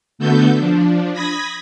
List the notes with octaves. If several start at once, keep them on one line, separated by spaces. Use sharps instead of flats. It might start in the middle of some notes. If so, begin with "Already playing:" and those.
D3 A3 B3 F#4 A4 G6
F3 D4
B5 D#6 G#6 A#6 B6